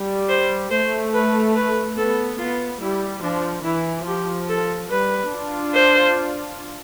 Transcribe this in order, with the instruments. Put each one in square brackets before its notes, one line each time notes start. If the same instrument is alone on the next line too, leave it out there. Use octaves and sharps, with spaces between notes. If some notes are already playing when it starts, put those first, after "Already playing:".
Already playing: [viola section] G3
[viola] C5
[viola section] A3 [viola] C5
[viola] B4
B4
[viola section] B3 [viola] A4
[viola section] B3 [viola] F4
[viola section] G3 [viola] E4
[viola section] F3 [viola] D4
[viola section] E3 [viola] E4
[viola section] F3 [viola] G4
[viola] A4
[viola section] G3 [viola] B4
[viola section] D4 F4
[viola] C5